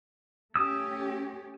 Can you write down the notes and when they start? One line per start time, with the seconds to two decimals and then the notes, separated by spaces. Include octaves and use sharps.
0.56 A3 C#4 G4 D#6 E6